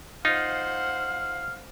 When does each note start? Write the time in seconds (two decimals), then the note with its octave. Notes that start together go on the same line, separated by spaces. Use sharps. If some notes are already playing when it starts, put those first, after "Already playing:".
0.25 D#4 F4 C5 F5 F#5